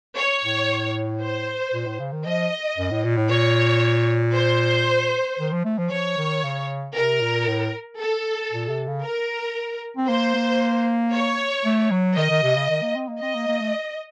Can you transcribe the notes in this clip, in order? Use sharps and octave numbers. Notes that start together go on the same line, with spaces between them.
C#5
A2
C5
A#2
A2
C#3
D#3
F3 D#5
F#2
A2
A#2
A2
A#2 C#5
C5
D#3
F3
A3
F3
F3 C#5
D#3
C#3
C3 A#4
A#2
A2
A4
A#2
C3
C#3
A#4
C4
A#3 C5
A#3
C#5
A3
F#3
D#3 D#5
D#3
C3
C#3
D#3
A#3
C4
A#3
C4 D#5
A#3
A#3
A3